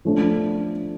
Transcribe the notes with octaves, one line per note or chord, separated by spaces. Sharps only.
F3 A3 D4